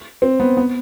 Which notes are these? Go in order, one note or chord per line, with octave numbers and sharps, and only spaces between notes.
C4
B3
B3